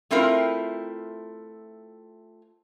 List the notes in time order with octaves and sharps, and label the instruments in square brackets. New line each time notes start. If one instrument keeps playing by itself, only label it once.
[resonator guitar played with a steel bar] A3 C4 E4 F4 A#4